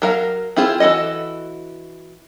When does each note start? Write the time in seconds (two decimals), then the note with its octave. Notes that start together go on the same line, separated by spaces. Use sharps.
0.02 F#3 A#4 F5
0.56 C4 E4 F4 G#4
0.80 E3 F#4 A4 D#5